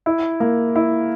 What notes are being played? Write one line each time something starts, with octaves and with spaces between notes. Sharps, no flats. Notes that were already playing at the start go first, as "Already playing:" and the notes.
E4
A#3
E4